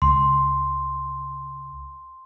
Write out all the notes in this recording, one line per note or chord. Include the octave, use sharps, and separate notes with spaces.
C#2 C6